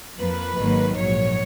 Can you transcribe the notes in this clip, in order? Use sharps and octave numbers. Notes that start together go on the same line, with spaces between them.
F2 F3 A#3 B4
G#1 G#2 D#3 F#3 A#3
A#1 G#2 F#3 C#5